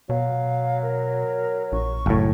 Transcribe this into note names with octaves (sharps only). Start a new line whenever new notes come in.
B2 F#3 F5
A#4
A#1 C#6
F#1 A2